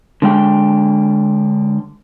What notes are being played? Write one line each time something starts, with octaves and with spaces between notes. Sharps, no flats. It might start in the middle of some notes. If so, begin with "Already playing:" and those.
D3 G#3 G5